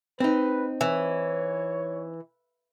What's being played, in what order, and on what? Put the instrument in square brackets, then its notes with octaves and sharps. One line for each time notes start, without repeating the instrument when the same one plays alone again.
[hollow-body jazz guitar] C4 D#4 [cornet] B4
[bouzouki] E3 [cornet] C#5